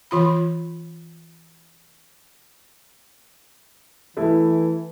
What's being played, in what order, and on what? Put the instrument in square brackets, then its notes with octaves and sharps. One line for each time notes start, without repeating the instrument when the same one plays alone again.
[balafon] E3 F4 B5
[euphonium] E3 [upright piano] A3 E4